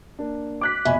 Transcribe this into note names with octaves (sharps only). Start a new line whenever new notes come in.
A#3 D4
D6 F#6 B6
F1 B2 E5 G#5 B5